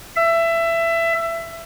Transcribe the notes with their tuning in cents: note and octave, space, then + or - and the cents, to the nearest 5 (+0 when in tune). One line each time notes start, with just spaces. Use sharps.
E5 +20